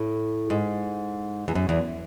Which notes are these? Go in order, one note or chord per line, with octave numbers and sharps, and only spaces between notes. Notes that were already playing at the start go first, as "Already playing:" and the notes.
Already playing: A2
G#2
E2
F#2
E2